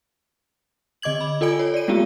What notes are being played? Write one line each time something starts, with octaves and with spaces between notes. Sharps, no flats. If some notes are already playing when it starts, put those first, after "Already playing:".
D3 D#5 D6 G#6 F#7
B5
F4 A4 D5 G#5 D7
C#5
D5 D#7
G#3 A3 B3 F4 G4